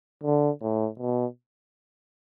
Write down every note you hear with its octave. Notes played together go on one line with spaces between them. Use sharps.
D3
A2
B2